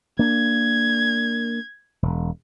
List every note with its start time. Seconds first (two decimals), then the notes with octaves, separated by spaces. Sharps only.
0.19 A#3 D4 G#6
2.02 E1